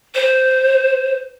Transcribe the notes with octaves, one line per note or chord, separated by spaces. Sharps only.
C5